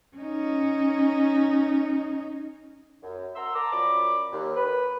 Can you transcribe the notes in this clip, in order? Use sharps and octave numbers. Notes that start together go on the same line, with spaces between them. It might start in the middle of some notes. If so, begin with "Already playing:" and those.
C#4 D#4
F#2
F#5 A#5 C6 E6
A5 A#5 D6
F#2 F3 D5 B5 D6
D#2
B4